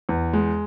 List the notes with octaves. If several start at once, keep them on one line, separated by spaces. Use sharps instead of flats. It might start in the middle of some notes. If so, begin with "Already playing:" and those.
E2
G#3